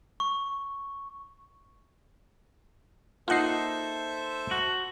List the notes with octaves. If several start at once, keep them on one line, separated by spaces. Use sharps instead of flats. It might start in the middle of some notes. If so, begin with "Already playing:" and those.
C#6
A#3 D#4 F4 A4 C5 E5 F#5 C7
F#4